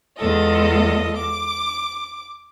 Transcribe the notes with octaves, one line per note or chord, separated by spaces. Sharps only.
E2 G#3 F4 A4 D#5
D6